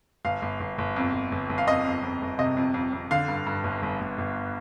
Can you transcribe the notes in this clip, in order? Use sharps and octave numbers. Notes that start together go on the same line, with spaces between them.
G1 F5
G1
G1
G1
F2
G1
G1
G1
F5
F2 D#5
F2
F2
G1
C3 D#5
F2
F2
F2
D3 F5
G2
G2
G1
G1
G1
G1